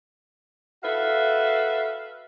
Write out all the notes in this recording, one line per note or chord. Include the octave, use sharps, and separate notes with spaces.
F#4 A4 B4 E5 F5